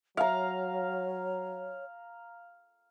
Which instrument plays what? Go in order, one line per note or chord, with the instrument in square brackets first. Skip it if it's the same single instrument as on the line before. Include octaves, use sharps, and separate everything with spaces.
[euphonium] F#3 [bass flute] C#5 [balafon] E5 [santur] F5 A#5